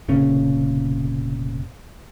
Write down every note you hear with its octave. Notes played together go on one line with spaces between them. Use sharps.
F1 A#2 C#3 C#4